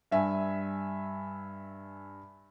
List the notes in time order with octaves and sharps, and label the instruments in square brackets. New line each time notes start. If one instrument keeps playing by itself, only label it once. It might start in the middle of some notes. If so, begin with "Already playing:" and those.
[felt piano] G2 E5 G#5